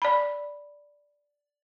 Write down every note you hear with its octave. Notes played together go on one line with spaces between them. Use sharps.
D5 B5